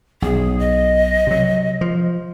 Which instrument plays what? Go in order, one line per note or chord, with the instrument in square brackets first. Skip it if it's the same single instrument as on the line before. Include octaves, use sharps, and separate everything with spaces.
[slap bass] B1 [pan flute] G#4
[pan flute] D#5
[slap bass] C3 F#3
F3